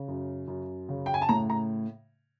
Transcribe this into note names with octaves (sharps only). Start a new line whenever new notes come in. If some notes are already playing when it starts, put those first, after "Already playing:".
Already playing: C#3
F#2
F#2
C#3
G5
G#5
A5
A2 A#5
A#5